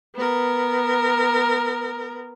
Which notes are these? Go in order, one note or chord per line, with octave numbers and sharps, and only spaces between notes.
B3 A#4